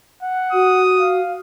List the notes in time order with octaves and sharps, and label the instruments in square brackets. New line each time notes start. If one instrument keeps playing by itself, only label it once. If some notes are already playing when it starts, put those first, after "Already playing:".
[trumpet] F#5
[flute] F#4 [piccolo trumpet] D#6
[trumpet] F5